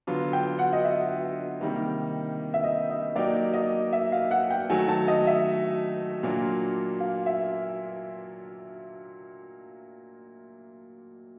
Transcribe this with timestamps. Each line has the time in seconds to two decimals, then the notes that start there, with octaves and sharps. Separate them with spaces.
0.07 D3 F#3 B3 D4 F4
0.33 G5
0.59 F#5
0.73 D#5
0.84 E5
1.61 C3 D#3 G3 A#3
2.54 E5
2.64 D#5
2.90 D#5
3.16 F#3 A#3 D#4 G4 D5
3.54 D#5
3.93 E5
4.12 F5
4.31 F#5
4.50 G5
4.69 D#3 F#3 A3 G#5
4.88 A5
5.08 D#5
5.27 E5
6.23 A#2 F#3 A#3 D4 F4
7.00 F5
7.26 E5